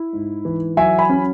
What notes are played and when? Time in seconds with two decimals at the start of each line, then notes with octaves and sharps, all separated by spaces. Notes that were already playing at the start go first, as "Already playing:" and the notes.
Already playing: E4
0.13 G#2
0.45 E3
0.77 F#3 E5 G#5
0.99 G#5 B5
1.09 C#4